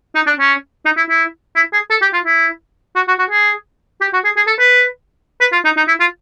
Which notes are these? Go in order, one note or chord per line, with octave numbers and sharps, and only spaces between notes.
D#4
D4
C#4
D#4
E4
E4
E4
G#4
A4
G4
F4
E4
F#4
F#4
F#4
G#4
G4
F#4
G#4
G#4
A4
B4
B4
F4
D#4
D#4
E4
F4